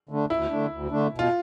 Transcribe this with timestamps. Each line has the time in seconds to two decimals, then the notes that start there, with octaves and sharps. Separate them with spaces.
0.09 D3 A3 D4
0.30 D2 E4
0.50 D3 A3 D4
0.71 D2
0.91 D3 A3 D4
1.12 B2
1.19 F4